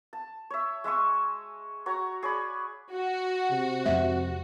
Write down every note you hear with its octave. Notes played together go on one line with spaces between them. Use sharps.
A5
C#5 E5
G#3 E5 G#5 C#6
F#4 C#5 A#5
G#4 C#5 D5 B5
F#4
C3
F2 G#3 E5